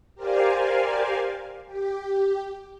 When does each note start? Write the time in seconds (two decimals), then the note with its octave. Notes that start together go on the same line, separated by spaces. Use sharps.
0.15 G4 A#4 C5 D5 F5 G#5
1.67 G4